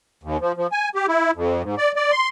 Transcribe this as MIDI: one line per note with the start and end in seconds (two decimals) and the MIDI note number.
0.23 0.37 39
0.41 0.52 53
0.57 0.67 53
0.72 0.89 80
0.95 1.06 67
1.08 1.31 64
1.36 1.62 41
1.63 1.75 44
1.78 1.92 74
1.96 2.12 74
2.12 2.29 84